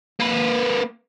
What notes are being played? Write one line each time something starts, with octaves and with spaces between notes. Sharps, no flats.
A#3 B4